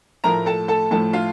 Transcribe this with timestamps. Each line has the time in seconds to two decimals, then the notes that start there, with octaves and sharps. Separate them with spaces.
0.24 A2 F3 A3 A#4 A#5
0.46 A4 A5
0.68 A4 A5
0.91 A2 F3 A3 A4 A5
1.13 F4 F5